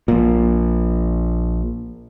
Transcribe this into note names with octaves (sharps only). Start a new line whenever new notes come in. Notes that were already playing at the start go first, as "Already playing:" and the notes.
A#1 A#2